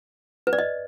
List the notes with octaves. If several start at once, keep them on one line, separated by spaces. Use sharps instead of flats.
B4
D5
D#5